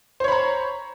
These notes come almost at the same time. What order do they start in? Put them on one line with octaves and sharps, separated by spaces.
C5 C#5 B5 A#5